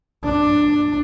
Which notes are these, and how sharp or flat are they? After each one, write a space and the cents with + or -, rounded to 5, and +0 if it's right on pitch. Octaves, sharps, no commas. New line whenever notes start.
D4 +10